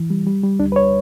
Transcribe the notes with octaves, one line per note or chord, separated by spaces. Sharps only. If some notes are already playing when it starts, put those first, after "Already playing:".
Already playing: E3
G3
G3
G3
D2 D4
B4
C#5